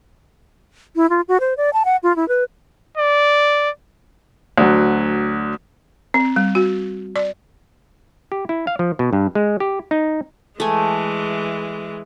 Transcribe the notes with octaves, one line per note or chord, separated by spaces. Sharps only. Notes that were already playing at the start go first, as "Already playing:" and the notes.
E4
F4
F#4
C5
D5
A5
F#5
F4
E4
B4
D5
D2 F#3
C4
G3
F#4
D5
G4
E4
F5
F3
B2
G2
G#3
G4
D#4
E3 G#3 A3 G#5